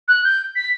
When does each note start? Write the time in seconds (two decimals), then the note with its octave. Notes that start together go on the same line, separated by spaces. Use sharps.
0.08 F#6
0.24 G6
0.55 B6